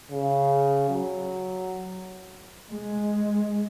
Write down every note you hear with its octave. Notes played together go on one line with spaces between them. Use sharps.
C#3
F#3
G#3